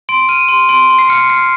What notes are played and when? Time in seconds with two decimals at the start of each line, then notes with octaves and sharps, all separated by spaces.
0.09 C6 D7
0.29 F6 D#7
0.48 C6
0.69 C6 D7
0.90 C6
0.99 C7
1.09 F6 C#7
1.30 F6 C7